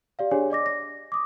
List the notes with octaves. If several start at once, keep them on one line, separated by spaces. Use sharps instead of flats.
G4 D5 F5
D4 G4 G#4 C#5 G#5
D5 D#5 D6 A#6
A#6
D6 D#6